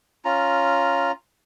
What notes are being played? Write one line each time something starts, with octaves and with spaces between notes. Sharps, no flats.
C#4 F4 A#5